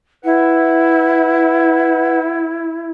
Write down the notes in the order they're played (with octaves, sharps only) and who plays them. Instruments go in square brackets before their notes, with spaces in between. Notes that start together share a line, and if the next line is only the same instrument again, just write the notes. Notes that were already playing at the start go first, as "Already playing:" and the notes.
[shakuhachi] E4 [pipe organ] B4 F#5